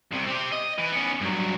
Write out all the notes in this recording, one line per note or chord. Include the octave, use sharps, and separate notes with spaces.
C2 C3
C4 G4
D#5
E3
B3 C#4
G2 F#3